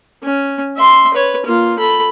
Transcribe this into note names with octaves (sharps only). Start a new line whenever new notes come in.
C#4
E5 C6
B4 C#5
A#3 F4
A4 B5